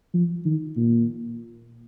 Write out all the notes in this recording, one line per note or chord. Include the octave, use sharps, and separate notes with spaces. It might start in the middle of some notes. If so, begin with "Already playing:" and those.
F3
D#3
A#2